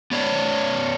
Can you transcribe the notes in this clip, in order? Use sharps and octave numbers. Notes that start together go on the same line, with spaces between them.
B3 C#5 D5